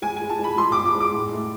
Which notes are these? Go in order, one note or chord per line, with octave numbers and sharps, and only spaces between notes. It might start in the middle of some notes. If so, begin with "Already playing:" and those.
G#3 G#5
G#3 G#5
A5
G#3 B5
G#3 C6
D6
G#3
D6
G#3
D6
A2
A3